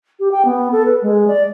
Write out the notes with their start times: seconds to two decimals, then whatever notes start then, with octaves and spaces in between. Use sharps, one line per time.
0.20 G4
0.31 G5
0.45 B3
0.72 A4
0.85 B4
1.02 G#3
1.28 D5